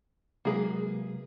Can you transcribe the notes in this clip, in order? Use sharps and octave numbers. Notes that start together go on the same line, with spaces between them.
C3 F#3 G#3 A#3 G#4 B4